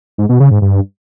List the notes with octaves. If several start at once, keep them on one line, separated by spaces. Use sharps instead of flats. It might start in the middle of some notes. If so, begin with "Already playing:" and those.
G#2
B2
C#3
G#2
G2